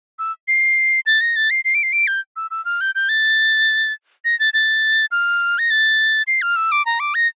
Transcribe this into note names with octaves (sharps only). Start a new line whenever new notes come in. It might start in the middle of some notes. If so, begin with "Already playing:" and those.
E6
C7
A6
A#6
A6
C7
C7
D7
C7
D7
G6
E6
E6
F6
G6
G6
A6
A#6
A6
A6
F6
A#6
A6
C7
F6
E6
D6
A#5
D6
A#6